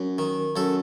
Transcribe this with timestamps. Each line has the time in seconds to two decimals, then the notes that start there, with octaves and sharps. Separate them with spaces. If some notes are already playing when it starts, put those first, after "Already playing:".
Already playing: F#2
0.18 D#3
0.56 F#2 A4